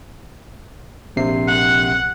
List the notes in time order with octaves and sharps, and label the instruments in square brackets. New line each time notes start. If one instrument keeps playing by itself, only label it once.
[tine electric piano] A#1 C3 C7
[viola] F#5